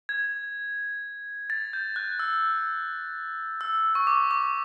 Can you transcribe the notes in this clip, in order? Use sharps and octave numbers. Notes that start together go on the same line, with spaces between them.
G#6
A6
G6
F#6
E6
E6
C#6
D6
D6